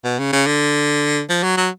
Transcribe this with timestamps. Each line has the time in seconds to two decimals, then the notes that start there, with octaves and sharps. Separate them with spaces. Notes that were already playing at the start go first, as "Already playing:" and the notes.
0.04 B2
0.19 C#3
0.33 C#3
0.47 D3
1.29 F3
1.43 F#3
1.57 F#3